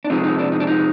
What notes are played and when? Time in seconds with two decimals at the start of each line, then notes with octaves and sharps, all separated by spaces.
0.05 D4
0.10 F2 C3 F3 G#3 C4 D#4
0.24 D#4
0.38 D4
0.52 D#4
0.60 D4
0.67 D#4